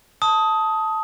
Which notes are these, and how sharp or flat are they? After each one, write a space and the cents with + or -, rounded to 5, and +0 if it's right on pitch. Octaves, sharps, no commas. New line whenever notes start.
A5 +0 D#6 +15